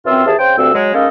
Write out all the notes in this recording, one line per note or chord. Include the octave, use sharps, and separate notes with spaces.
F#2 E3 C4 F4 E6
D#2 E3 G#4 A5
C#3 C5 G5
D2 G2 C4 E6
F#3 G#3
G#3 A#3 C#4 D#4 A4